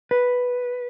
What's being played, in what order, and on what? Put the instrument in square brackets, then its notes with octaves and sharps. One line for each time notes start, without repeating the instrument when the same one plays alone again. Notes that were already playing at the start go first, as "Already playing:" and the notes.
[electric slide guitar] B4